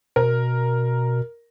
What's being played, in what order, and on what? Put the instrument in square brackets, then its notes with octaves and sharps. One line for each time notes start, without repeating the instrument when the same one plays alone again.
[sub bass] B2 [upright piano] A#4